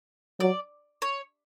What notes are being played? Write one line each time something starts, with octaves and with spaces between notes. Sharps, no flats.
F#3 D5
C#5